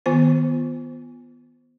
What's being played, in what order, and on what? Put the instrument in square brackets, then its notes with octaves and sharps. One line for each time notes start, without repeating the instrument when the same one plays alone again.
[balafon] D#3 B3 F4 C5